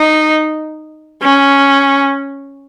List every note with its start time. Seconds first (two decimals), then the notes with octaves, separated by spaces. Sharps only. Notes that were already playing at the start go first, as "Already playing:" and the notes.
Already playing: D#4
1.22 C#4